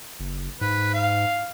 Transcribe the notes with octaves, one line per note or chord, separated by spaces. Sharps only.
F#1
G#2 B4
F5